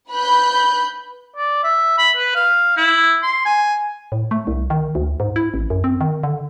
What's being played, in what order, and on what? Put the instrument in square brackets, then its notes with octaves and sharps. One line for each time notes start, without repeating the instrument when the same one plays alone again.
[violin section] B4 B5 F#6 G6
[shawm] D5
E5
B5
B4
F5
E4
C6
G#5
[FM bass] A2
A3
C2
D#3
D2
G#2
E4
A1
F#2
C4
D#3
D3